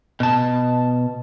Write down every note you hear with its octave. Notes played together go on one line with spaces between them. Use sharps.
B2 A5